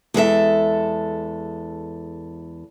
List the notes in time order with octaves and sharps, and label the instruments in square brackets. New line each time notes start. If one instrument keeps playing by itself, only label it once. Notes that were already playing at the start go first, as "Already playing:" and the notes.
[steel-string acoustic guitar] E2 G#3 A4 E5